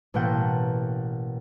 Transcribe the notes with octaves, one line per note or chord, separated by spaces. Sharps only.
A1 B2 A3 A#3 F#5 G5